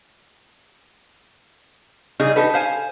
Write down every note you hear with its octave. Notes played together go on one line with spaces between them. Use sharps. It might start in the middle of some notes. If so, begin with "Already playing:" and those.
C#3 G3 D#4 G#4
D#4 G4 A4 B4
C5 F5 G#5